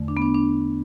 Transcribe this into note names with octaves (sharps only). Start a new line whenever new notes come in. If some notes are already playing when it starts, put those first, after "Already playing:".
Already playing: E2 D3 A3
D4
B3
D4
D4